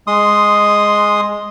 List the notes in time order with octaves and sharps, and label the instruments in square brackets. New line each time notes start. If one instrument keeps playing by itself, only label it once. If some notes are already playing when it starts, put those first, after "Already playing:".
[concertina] G#3 C6 D#6